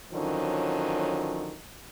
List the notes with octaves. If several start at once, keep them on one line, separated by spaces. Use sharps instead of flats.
D3 D#3 F3 F#3 C#4